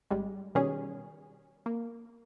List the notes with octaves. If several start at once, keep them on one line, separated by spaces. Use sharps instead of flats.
G#1 G3 G#3
B2 D#3 G3 C#4 G#4
A#3